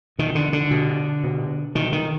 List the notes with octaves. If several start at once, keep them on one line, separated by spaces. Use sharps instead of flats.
B2 D#3
D3
D3
B2
B2
B2 D#3
D#3